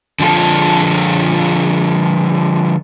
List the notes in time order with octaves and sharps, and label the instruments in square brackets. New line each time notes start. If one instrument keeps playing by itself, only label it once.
[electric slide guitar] D3 F3 F4 A4